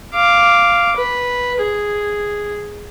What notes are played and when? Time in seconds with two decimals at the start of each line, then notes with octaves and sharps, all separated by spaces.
0.14 F5 D6
0.96 B4
1.61 G#4